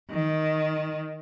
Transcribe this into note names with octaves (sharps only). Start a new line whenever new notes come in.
D#3